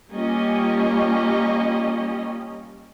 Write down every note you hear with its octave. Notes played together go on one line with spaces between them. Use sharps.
G3 A#3 C#4 F4 G4 D#5